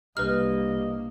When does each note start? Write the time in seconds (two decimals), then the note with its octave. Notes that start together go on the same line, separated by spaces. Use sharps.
0.17 C2 G2 A#3 B4 D#5 F6